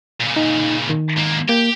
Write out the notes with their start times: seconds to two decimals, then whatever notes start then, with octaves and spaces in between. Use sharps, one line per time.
0.21 A#2 C#3
0.36 D#4
0.90 D#3
1.17 G#2 A#3
1.49 A#3 G4